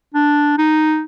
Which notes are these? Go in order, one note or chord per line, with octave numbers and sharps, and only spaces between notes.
D4
D#4